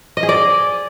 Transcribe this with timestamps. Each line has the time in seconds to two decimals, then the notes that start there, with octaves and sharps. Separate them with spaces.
0.17 D#5
0.23 G#4
0.29 D5